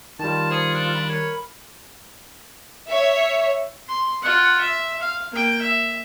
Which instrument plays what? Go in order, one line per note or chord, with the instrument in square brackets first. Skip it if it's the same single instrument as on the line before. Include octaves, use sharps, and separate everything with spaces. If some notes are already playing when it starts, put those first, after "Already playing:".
[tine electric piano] D#3 G3 [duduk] F4 [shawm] A5
[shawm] G#4 [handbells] C5 D#6 C#7
[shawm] D4
[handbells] B5
[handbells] A#4 B5 [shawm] C#5
[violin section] C#5 E5
[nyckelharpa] C6
F4 F#5
E5
F5
A#3 G5
E5